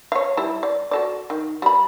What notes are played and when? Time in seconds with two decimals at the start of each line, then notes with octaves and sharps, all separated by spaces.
0.12 C#5 F5
0.37 G3 E4
0.63 D5
0.91 F#4 A4 D5
1.30 D#3
1.62 G3 B5